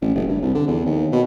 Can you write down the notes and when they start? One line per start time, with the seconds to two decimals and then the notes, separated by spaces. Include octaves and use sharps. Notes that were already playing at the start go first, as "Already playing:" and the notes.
0.02 A1
0.15 F#1
0.29 G2
0.42 C2
0.55 D3
0.68 E2
0.86 D#2
1.12 B2